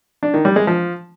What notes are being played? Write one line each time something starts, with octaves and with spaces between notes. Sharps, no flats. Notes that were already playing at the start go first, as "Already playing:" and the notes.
D4
D#3
G3
G#3
F3